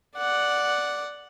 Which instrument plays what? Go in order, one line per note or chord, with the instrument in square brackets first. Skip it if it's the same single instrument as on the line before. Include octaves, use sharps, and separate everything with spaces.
[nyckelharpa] D5 F#5